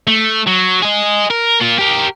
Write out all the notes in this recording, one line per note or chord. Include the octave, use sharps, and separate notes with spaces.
A3
F#3
G#4 D#5
A#4
A#3 F4
G4 A#4